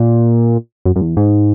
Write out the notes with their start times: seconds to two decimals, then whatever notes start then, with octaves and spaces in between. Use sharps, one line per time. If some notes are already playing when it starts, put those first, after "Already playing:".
Already playing: A#2
0.85 F#2
0.96 F#2
1.01 E2
1.17 G#2